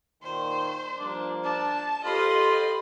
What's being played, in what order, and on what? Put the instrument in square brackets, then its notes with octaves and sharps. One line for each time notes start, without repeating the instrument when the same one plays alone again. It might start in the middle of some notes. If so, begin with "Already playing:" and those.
[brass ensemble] A#2 D#3 [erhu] C5
[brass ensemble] F3 G3 A#3 [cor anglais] D4
[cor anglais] D4 [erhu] A5
[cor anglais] F4 [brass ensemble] G4 A4 C5 [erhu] D#5 [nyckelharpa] B5 C6